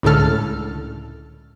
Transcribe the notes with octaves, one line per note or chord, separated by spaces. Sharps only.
C#2 A2 D3 A4 F6